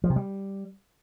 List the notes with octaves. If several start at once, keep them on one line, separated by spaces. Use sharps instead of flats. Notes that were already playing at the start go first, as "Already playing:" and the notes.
F3
C3
G3